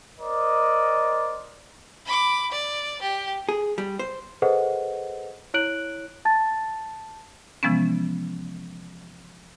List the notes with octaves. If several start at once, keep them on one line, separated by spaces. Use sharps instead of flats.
A#4 C5 D5 D#5
B5 D6
D5
G4
G#4
G3
C5
G#4 A4 B4 C5 D#5 F#5
E4 C#5 F#6 D7 F#7
A5 A6
C3 E3 F3 G#3 B3 C#4